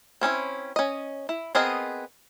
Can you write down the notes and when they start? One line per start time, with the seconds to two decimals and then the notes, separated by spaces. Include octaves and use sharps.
0.21 C4 C#4 D#4 E4
0.76 C#4 D#5
1.29 E4
1.55 B3 C4 G#4 A#4 D#5